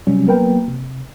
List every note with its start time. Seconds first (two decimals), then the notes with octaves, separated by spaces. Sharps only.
0.07 C3 F#3 G3 C#4
0.27 F#3 A#3 B3 A#4 B4 G5
0.68 C3